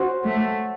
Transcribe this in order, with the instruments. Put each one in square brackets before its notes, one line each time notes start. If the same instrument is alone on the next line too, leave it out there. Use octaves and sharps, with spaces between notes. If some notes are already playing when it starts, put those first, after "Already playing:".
Already playing: [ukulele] C#4 F#4 C5
[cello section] A3